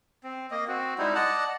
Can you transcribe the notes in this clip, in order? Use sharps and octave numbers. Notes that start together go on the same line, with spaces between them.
C4
A#3 D#5
C4 F#4
G3 G#3 D#4 E4
D5 D#5 F#5 A5